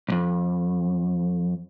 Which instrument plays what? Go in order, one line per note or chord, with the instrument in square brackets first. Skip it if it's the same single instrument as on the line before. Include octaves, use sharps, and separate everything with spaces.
[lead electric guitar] B1 F2